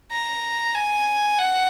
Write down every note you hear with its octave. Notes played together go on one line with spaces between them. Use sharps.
A#5
G#5
F#5